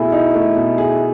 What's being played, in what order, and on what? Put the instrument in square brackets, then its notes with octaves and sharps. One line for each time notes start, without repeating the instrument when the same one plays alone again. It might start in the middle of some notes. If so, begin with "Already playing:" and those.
Already playing: [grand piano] B2 A3 G#4 [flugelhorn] E4
[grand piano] D#4
A3
B2
G#4